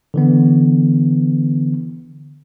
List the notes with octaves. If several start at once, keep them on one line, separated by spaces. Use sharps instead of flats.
D3 E3 B3